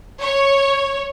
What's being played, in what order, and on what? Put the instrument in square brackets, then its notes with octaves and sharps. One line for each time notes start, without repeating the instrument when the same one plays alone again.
[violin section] C#5